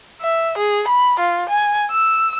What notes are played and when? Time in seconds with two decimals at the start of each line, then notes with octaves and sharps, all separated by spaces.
0.21 E5
0.58 G#4
0.88 B5
1.19 F4
1.49 G#5
1.91 E6